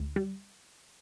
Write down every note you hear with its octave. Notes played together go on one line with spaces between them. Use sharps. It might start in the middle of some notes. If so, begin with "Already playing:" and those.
Already playing: D2
G3